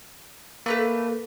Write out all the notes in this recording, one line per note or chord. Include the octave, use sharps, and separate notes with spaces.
A3 A#3 B4 F#6